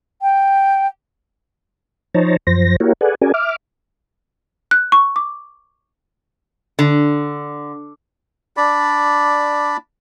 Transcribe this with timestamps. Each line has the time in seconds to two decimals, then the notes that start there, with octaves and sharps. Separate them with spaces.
0.22 G5
2.15 F3 D#4 C5 C#5 A5 A#5
2.47 F#2 F3 C5 A#6
2.80 A#3 E4 F#4 G4 A#4 C#5
3.01 G#4 A4 B4 D5 F#5 G#5
3.22 C#4 F#4 G#4 A#4 D5 G#5
3.34 E5 D6 F6
4.71 F#6
4.92 C#6
5.16 D6
6.79 D3
8.57 D4 D5 B5